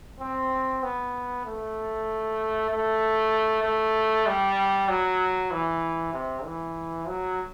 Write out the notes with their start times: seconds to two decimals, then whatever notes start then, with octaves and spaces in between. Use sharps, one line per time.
0.20 C4
0.83 B3
1.45 A3
2.70 A3
3.64 A3
4.27 G3
4.88 F#3
5.51 E3
6.13 C3
6.45 E3
7.07 F#3